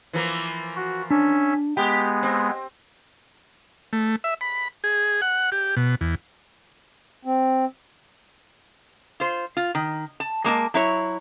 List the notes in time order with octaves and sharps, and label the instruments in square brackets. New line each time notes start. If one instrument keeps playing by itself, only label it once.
[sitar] E3 F3 A#3
[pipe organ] F#4
[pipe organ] C#4 E5 [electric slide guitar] D4
[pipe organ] G#3 B3 [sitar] G4 [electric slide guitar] G5
[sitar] C4
[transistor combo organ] A3
E5
B5
G#4
F#5
G4
B2
E2
[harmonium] C4
[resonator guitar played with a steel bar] F4 C5
F4
D#3
A5
G#3 A#3 D#5 A5
F#3 E4 C#5